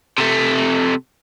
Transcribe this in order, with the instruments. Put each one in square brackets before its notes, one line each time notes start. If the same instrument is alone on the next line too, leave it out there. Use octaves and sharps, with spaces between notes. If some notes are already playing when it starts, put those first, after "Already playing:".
[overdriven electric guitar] C3 A3